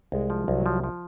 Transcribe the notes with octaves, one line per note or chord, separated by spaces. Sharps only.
C2 G#3
F3
C2 F#3
F3
F3